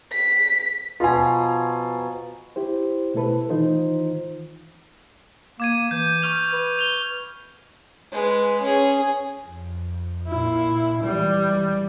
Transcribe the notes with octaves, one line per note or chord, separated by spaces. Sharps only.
B6
B2 F3 F4 G#5 A#5
E4 G4 C5
B2 A3 E4 A4 B4
D#3 E3 D#4 F4 C5
A#3 D6 G#6 D#7
E3 G6
C#6 F6 F7
B4
F7 G7
G#3 B4
C#4 G#4
F2
A#2 E4
E3 G3